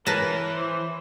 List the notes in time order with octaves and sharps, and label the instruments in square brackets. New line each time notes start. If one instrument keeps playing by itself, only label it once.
[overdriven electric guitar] E3 [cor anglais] A#4 [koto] B4 A5 [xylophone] C#5 A#6
[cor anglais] C5